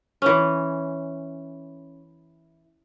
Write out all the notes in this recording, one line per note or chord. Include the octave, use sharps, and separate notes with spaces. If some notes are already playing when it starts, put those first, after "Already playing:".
E3 C#4